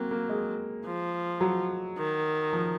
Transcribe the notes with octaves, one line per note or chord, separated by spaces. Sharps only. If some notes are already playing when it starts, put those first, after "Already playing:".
Already playing: F#3 A#3 C4
A#3
G#3
F3
F#3
D#3
F3